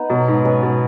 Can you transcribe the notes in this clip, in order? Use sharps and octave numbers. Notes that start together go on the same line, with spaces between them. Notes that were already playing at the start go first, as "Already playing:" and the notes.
Already playing: B3 D#4
B2 F#3
G#2
B2 C#4 B4 D#5
B2